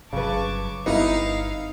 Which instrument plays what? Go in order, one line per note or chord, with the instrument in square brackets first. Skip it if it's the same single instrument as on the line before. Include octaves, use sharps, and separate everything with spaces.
[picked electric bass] G1 F#3 [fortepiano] C#3 B4 [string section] A5 C#6 D6
[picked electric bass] G1 C4 [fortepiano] B3 E4 [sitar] D#4 [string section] F5